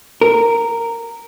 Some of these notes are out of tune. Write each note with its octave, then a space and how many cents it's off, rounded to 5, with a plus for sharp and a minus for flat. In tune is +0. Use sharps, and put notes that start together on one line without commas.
A#4 -10